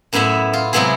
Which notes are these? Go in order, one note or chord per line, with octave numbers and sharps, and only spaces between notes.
F#2 A2 B3 E4 E5
F4
C3 F#3 G#3 B3 E4 G#4